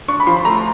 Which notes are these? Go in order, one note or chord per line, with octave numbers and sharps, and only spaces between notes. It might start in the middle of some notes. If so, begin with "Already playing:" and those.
D4 C#6
B5
F3 C6
B5
A3 A#5